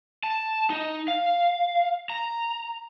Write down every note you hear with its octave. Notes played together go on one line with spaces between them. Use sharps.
A5
D#4
F5
A#5